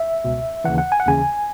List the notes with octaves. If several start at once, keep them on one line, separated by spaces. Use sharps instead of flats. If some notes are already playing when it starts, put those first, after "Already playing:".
Already playing: E5
C#2 B2
D#2 C#3 E3 F#5
F#5
G#5
F#5
D#2 C#3 E3 G#5